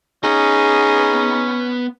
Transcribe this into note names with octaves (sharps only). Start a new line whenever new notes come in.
B3 C#4 D#4 G#4 F#5